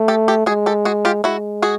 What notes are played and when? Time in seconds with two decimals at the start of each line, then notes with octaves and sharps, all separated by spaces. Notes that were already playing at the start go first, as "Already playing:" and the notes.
Already playing: A3
0.08 G4 A4
0.28 G4 A4
0.46 G#3 F#4 G#4
0.66 G4 A4
0.85 F#4 G#4
1.05 F4 G4
1.24 G#3 E4 F#4
1.62 F#4 G#4